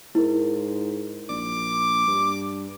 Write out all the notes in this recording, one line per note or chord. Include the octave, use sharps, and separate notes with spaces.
G#2 E4 A#4
A#1 D6
G2